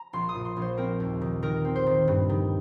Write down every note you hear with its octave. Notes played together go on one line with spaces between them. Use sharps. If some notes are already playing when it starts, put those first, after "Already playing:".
Already playing: A#5
A#1 C6
D#6
A#2
C6
A#1
C5
C4 A#4
D#2
D#3
D#3 A#4
C4
C5
D#3
G2
D#3